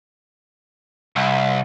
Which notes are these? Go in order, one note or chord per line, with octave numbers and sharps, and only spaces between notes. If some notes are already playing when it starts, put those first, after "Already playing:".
C2